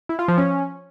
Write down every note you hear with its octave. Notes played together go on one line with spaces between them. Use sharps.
E4
F4
F3
C#4